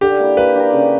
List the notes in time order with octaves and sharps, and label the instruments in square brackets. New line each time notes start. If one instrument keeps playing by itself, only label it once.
[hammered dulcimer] D3 [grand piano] G4
[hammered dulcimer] A#3 E4
[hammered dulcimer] A#3 [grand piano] B4
[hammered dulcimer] D4 G4 A#4
C#3